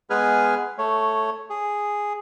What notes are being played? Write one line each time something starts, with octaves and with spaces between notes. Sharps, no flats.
G#3 B3 G#4 B4 G#5 F6
A3 C#5
G#4